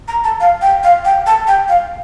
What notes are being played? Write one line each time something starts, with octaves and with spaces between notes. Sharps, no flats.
A#5
A5
F5
G5
F5
G5
A5
G5
F5